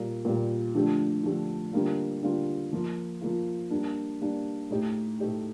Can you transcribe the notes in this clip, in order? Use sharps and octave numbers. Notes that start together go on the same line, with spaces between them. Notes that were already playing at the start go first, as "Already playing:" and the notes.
Already playing: A#2 G3 A#3
A#2 G3 A#3
D3 F3 A3 D4 G4
D3 F3 A3 D4 G4
D3 G3 A#3 F4
D3 G3 A#3 F4
F3 A#3 F4
F3 A#3 F4
G3 A#3 D4
G3 A#3 D4
A2 A3 D#4 G4
A2 A3 D#4 G4